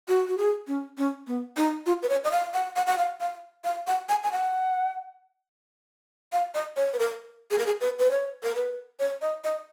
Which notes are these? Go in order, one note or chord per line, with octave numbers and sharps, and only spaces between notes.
F#4
F#4
G#4
C#4
C#4
B3
D#4
F4
B4
C#5
D#5
F5
F#5
F#5
F#5
F5
F5
F5
F#5
G#5
G#5
F#5
F5
D#5
C#5
B4
A#4
G#4
A#4
G#4
B4
B4
C#5
A#4
B4
C#5
D#5
D#5